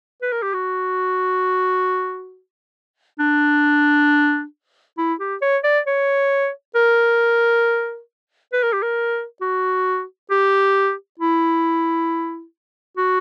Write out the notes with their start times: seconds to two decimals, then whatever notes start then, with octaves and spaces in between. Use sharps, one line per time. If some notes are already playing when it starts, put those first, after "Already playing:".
0.22 B4
0.32 A#4
0.42 G4
0.53 F#4
3.19 D4
4.98 E4
5.20 G4
5.42 C#5
5.64 D5
5.87 C#5
6.75 A#4
8.53 B4
8.63 A#4
8.72 G4
8.82 A#4
9.41 F#4
10.30 G4
11.19 E4
12.97 F#4